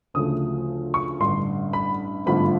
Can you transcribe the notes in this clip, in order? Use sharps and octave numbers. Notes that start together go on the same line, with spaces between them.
D2 C#3 F3 A3 D#6
C#6
A1 G2 D3 C6
B5
G#1 G2 D3 F3 A3 B5